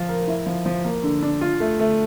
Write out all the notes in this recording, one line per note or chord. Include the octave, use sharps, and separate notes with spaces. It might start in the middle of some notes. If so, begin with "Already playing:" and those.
Already playing: F3 F4
A#4
E4
F3
F3
A#3
D3
D4
F4
A3
A3